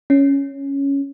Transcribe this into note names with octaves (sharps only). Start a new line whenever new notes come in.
C#4